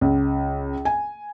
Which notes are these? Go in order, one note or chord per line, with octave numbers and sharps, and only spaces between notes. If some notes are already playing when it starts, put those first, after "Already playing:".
C#2
G#5